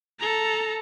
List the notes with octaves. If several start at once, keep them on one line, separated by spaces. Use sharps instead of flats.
A4 A#5